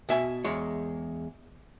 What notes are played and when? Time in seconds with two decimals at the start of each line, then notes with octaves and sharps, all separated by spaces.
0.09 B2 E5 G#5
0.44 E2 G#3 C#5